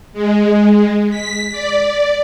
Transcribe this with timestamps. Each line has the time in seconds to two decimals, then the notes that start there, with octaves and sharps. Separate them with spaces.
0.13 G#3
1.10 B6
1.51 D5